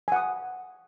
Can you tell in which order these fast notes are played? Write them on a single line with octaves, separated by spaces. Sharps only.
G#5 F#5 D#6